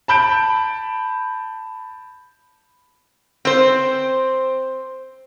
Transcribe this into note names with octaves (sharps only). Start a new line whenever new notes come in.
A5 B5 G6 D7
C4 C5